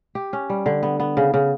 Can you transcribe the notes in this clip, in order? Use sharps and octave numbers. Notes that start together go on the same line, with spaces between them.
G4
C#4
G3
D3
B3
B3
C#3
C#3